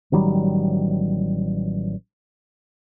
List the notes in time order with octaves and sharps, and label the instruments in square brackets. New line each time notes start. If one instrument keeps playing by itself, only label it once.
[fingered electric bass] A1 D#3 F#3 G3